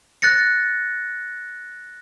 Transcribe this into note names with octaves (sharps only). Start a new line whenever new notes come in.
F#6 A6 A#6 C#7